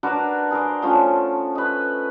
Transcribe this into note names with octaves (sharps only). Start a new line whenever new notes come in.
D4 F#4 A#4 B4
G#4 A#4 C5 D5
F3 A3 C#4 F4
B4 D#5